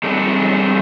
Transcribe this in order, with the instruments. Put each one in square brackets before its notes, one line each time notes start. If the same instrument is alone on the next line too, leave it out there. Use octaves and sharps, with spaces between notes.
[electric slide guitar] G3 G#3 C4 D4 D#4 A4